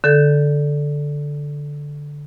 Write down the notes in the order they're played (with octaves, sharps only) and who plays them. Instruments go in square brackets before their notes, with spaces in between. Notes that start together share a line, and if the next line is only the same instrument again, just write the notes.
[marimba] D3 A4 G6